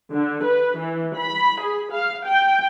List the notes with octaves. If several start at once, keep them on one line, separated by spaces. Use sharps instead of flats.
D3
B4
E3
B5
G#4
F5
G5